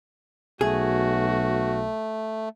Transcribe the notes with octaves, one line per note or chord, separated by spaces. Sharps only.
B1 A3 F#4 G#4